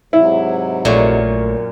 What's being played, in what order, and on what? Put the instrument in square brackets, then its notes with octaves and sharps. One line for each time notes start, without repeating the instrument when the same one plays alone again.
[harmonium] G#2 C3 F#3 [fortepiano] E4
[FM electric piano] A#1 A3 C#5 [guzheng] F#2 A#2